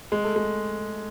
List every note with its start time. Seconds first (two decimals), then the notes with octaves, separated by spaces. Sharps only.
0.12 G#3
0.24 A3
0.36 G#3